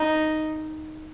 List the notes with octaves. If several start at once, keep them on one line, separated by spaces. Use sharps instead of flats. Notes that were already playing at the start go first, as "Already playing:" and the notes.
Already playing: D#4